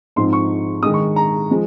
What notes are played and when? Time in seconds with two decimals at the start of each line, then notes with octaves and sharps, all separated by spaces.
0.16 G#2 F3 C4 D#4 C6
0.33 C#6
0.83 D#3 G#3 D#4 D#6
0.94 C#6
1.16 A#5
1.51 F3 G#3